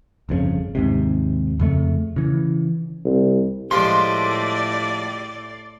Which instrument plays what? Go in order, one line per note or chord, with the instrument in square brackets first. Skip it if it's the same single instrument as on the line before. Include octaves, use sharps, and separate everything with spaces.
[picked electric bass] G1 F2 G#2 C#3
D#2 G#2 C3
F2 C#3 A3
C#3 E3
[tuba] C2
[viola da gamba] A2 [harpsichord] F3 G3 G#3 [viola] D5 [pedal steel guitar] C6